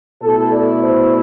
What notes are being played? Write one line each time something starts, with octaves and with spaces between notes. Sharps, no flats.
B2 A3 E4 A4
D5
C5